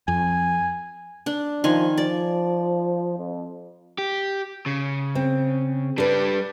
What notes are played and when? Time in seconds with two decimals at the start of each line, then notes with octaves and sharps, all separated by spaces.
0.08 F2 G#5
1.26 D4
1.64 D#3 F3 G#5 C6
1.98 F3 D5
3.18 F2
3.98 G4
4.66 C#3
5.15 C4
5.98 G3 D4 A4 B4